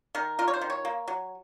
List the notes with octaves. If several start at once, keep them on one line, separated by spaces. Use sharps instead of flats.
D#3 A#4
F4 A#4
C#5
C5
D#3
C#5
A#3
F#3